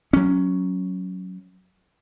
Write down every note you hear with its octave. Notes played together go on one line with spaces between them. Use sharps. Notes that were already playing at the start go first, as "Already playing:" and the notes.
F#3 C#4